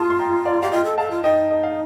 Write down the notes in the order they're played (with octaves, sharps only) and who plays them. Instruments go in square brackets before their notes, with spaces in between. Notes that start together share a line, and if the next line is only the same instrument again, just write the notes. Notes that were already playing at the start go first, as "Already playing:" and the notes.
Already playing: [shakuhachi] F4 [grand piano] A5 C6 D#6
[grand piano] C6
G5 A#5
D5 F5
[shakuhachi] G4 [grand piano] F5
[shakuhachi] F4 [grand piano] D#5 G5
[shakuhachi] A4
[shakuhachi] A4 [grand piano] F5 A5
[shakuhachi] F4
[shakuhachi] D#4 [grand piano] D#5 G5
[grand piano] D#5
F5